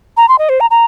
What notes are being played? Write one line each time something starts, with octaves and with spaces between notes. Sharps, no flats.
A#5
C6
D#5
C5
A#5
A#5